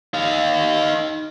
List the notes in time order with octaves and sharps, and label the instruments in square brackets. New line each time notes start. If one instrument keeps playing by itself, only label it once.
[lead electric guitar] D#4 F5